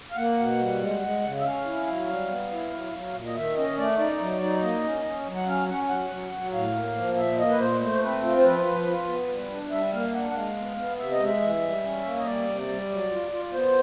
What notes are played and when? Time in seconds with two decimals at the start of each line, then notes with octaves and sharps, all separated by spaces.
0.11 F5
0.17 A#3 F#5
0.39 B2
0.60 G3
0.81 G#3
1.02 G#3
1.23 C#3
1.40 E5
1.44 C#4 F5
1.65 E4
1.87 F#3
2.08 G3
2.29 B3
2.51 E4
2.72 F#3
2.93 F#3
3.14 A#2
3.27 D#5
3.35 D#3 E5
3.57 C#4 D#5
3.77 A3 D5
3.99 D#4 D5
4.20 F#3
4.42 D#4
4.62 A#3 D#5
4.84 C#4
5.04 C#4
5.27 F#3
5.36 F#5
5.47 C#4 F5
5.68 C#4 F#5
5.89 F#3 F#5
6.10 F#3
6.32 F#3
6.53 A2 F5
6.75 A#3
6.96 F3
7.17 A#2 E5
7.39 A#3 D#5
7.49 B4
7.59 A#2 C5
7.80 A3 C5
8.02 C4 B4
8.23 F4
8.38 C5
8.45 F3 B4
8.66 F3
8.87 F4
9.07 B3
9.29 G3
9.50 D4
9.71 G3 E5
9.93 A#3 F5
10.14 D4 F#5
10.31 F#5
10.35 G#3 F5
10.57 B3
10.77 B3
10.99 C3 E5
11.11 D#5
11.19 G#3
11.25 E5
11.41 E3
11.62 G3
11.84 C#4
12.05 A#3
12.18 D#5
12.26 G3 D5
12.47 C3
12.68 G3
12.90 F#3
13.11 F4
13.32 F4
13.53 B3 C5